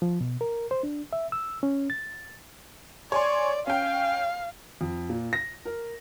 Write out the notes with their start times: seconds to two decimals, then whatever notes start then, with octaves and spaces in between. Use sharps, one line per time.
0.02 F3
0.21 B2
0.41 A#4
0.71 C5
0.83 D4
1.13 E5
1.32 E6
1.63 C#4
1.90 A6
3.12 C#5 D5 G#5 C6
3.67 C#4 F5 G5
4.81 F2
5.09 A#2
5.33 A#6
5.65 A#4